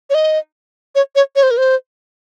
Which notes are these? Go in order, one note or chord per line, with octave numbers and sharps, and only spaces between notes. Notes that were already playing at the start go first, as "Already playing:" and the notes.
C#5
D#5
C#5
C#5
C#5
C5
A#4
C5